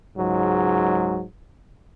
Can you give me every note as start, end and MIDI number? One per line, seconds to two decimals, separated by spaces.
0.17 1.24 37
0.17 1.24 44
0.17 1.24 54